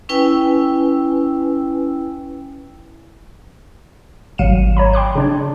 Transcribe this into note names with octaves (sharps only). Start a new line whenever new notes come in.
C#4 E4 B4 G5 G#5 E6
G#1 F#3 F5 C#7 D#7 E7
C#5 A#5 B5
G5 C6 D6 F#6
C#3 D4 C#5